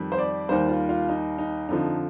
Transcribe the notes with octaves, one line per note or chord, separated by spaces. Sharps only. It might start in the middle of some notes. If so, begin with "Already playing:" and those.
Already playing: F2 D#3 G3
C5
D5
D#2 D#3 G3 C5
F4
F4
D#4
D#4
F2 D3 F3 D#4